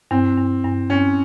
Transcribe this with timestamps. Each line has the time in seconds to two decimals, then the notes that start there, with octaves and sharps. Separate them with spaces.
0.11 G2 C4
0.37 G2
0.64 G2
0.90 G2 C#4